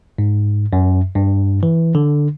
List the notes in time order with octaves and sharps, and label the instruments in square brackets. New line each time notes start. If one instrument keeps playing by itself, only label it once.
[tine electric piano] G#2
F#2
G2
E3
D3